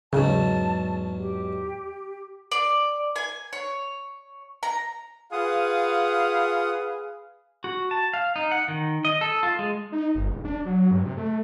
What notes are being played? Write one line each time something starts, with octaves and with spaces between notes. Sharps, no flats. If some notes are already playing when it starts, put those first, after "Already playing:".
E2 G#2 C#3 F#3 A5
G4
D5
G#5
C#5
A#5
F4 G#4 B4 F5 F#5 D#6
F#4
A5
F5
D#4
F#5
D#3
D#5
A4
F4
G#3
D#4
G1
E1
D4
F#3
G2
C3
A3